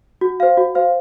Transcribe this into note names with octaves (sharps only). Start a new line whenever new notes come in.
F#4
C5 F5
F#4
C5 F5